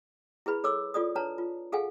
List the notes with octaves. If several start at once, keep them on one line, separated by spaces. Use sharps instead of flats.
E4 G#4 B4 B5
A4 C#5 D6 E6
F4 A4 D5 D#6
D4 B4 C#5 A5 A#5
F4
G#4 A4 F5 F#5 G#5